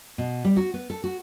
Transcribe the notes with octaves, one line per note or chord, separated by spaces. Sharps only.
B2
G3
F#4
B3
A4
F#4